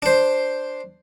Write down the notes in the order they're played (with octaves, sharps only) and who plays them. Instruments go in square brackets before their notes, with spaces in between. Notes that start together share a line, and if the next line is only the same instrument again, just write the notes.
[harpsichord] D4 C5